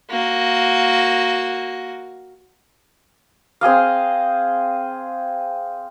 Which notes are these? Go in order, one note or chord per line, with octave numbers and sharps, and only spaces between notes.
A#3 F#4
C4 G#4 D#5 F5